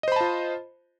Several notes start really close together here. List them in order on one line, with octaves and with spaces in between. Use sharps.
D#5 C5 B5 A5 F4